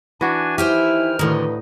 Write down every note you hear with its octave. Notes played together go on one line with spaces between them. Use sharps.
E3 D4 F#4 G#5
D#3 D#4 E4 G4 C5 G5 G#5 F6
D2 A2 D3 D#3 D#4 B4